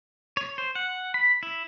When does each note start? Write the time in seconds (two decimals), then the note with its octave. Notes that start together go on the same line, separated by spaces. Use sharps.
0.37 C#5
0.58 C5
0.75 F#5
1.14 B5
1.43 E4